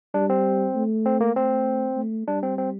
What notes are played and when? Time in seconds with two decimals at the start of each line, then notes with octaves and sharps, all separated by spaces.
0.14 G3 D4
0.30 C4
0.75 A3
1.06 C4
1.21 A#3
1.36 A3 C4
1.97 A3
2.27 G3 D4
2.43 C4
2.58 C4